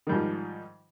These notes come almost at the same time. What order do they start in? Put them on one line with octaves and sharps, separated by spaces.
D#3 G3 G#2 F3